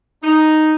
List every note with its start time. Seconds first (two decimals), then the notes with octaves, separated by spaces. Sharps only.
0.23 D#4